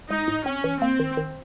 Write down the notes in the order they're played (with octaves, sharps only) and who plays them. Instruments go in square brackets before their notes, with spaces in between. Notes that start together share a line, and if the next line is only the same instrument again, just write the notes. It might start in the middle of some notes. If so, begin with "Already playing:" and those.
[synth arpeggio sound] G#3 [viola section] D#4
[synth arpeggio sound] A2
[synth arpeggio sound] C4 [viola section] C#4
[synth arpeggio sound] E3
[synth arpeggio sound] A#3 [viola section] C4
[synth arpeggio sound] D#3
D#3